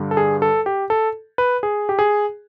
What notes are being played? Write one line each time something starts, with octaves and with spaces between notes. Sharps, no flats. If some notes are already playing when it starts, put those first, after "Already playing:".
Already playing: G2 D3 G3
A4
G#4
A4
G4
A4
B4
G#4
G4
G#4